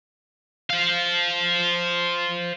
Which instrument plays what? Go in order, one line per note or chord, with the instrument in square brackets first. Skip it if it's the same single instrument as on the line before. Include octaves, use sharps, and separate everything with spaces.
[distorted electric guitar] C5 F5